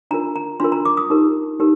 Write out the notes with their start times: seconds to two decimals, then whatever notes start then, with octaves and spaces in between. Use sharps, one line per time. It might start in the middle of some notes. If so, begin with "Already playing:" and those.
0.11 D4 F4 A#4 A#5
0.36 A#5
0.60 D4 F4 A#4 C6
0.72 A#5
0.85 D6
0.97 D#6
1.10 D#4 G4 A#4
1.60 D#4 G4 A#4